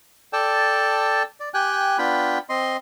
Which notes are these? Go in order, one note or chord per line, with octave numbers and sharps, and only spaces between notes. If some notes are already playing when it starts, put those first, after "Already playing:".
A4 D5 G5 A5
D5
G4 G5 G#5 F#6
B3 D4 F4 G5 B5
C4 D#5 C6